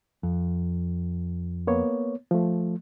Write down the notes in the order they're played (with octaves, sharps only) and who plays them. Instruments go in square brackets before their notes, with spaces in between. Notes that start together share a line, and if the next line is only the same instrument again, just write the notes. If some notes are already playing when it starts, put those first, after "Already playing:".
[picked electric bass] F2
[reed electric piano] A#3 B3 C#5
F3 A3